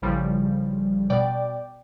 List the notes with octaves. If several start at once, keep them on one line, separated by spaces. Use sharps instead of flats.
A1 C#3 F3 G3
B2 D5 G5 D6